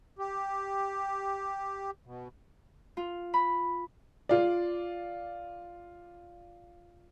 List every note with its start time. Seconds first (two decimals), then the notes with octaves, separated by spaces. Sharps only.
0.19 G4
2.06 B2
2.97 F4
3.34 B5
4.29 F4 D5